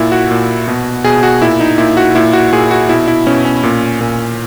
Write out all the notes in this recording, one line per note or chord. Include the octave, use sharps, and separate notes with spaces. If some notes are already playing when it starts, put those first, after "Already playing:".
Already playing: A#2 E4
F#4
A#2
B2
B2 G#4
F#4
A#2 E4
D#4
A#2 E4
F#4
A#2 E4
F#4
A#2 G#4
F#4
B2 E4
E4
B2 C#4
C#4
A#2
A#2